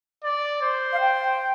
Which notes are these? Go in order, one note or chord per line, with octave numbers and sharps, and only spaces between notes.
D5
C5
F5
G5